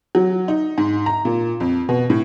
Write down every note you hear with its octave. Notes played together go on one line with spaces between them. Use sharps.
F#3
D#4
G#2
A#5
A#2
F2
B2
A2